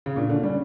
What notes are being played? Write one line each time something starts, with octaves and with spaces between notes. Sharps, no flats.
C#3
A#2 D4
D3 C#4
G3 C#4